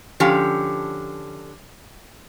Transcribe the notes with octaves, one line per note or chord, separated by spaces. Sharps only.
D3 F3 C#4 G4